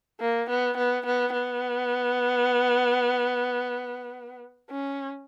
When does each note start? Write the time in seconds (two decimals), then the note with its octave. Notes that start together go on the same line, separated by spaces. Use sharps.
0.20 A#3
0.50 B3
0.77 B3
1.06 B3
1.33 B3
4.70 C#4